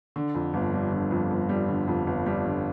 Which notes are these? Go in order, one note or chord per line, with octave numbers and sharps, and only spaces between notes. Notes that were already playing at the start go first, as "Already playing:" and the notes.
D3
F2
G1
G3
D3
F2
G1
G3
D3
F2
G1
G3
D3